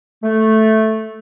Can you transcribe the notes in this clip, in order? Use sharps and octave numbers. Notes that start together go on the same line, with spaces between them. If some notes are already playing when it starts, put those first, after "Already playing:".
A3